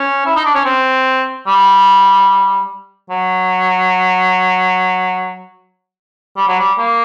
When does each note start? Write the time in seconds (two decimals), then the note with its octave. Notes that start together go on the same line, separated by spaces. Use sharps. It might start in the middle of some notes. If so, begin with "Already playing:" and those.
Already playing: C#4
0.26 E4
0.36 D#4
0.45 D4
0.55 C#4
0.65 C4
1.47 G3
3.10 F#3
6.37 G3
6.48 F#3
6.59 G3
6.78 A#3